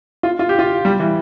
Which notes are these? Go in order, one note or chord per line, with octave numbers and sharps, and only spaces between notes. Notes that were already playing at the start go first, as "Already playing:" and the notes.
F4
F4
G4
F4
G3
E3